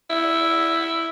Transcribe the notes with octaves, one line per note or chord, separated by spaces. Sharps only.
E4